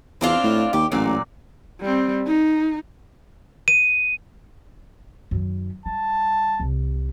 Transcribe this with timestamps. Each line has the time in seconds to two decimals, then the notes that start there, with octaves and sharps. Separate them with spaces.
0.21 E2 C4 D4 F4
0.43 A2
0.73 D#2 G4
0.92 A1 A#2 F#3 D5
1.81 G3 C4
2.26 D#4
3.68 D#7
5.31 F#2 D#3
5.86 G3 A5
6.60 C2 C3